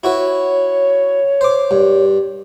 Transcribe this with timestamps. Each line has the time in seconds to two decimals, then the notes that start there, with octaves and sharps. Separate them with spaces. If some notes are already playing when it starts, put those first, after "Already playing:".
0.04 E4 F#4 B4 C#5
1.41 C5 D6
1.71 G2